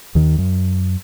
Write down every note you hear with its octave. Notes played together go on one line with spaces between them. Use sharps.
D#2 D#3
F#2